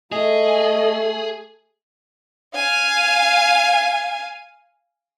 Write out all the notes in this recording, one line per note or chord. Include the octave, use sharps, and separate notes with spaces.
A3 G#4 D#5
F5 G#5